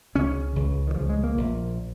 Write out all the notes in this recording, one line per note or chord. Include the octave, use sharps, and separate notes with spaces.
C#2 C#3 C#4
C#2 C#3
D#3
C#2 C#3 F3
G#3
A#3
A#1 A#2